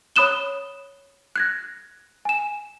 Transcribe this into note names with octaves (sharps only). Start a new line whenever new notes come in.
C#5 B5 D#6 F#6 E7 G7
F#6 G#6 A#6
G#5 E7